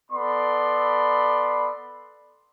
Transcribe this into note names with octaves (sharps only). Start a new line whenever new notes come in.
B3 A4 D5 B5 C6